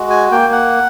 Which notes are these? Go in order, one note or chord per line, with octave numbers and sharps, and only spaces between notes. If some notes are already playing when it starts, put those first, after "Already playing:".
Already playing: G#3 F#4
G#5
A#3 G5
F#5